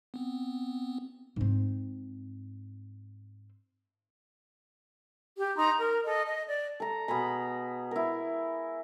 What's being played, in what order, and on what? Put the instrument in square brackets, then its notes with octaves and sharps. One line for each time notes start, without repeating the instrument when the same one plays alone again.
[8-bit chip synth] B3 C4
[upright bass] G#2 C4
[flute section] G4
D#4 A#5 C6
A#4
A4 D#5
D#5
D5
[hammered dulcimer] A4 A#5
B2 G#4 A#5 B5
E4 A#4